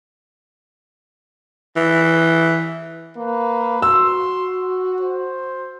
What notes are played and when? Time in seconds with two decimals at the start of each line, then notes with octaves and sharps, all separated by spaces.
1.76 E3
3.17 A#3 B4
3.82 F#4 C6 E6
5.01 C5